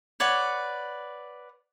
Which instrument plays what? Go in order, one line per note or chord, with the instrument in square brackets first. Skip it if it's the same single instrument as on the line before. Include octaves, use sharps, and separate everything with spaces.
[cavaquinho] B4 C#5 D5 F#5